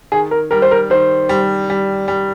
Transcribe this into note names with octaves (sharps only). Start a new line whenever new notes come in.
D#3 G#4
A#4
G3 A#4
C5
A#4
D#3 C5
G3
G3
G3